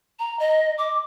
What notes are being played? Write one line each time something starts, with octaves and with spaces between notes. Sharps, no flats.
A#5
D#5
D6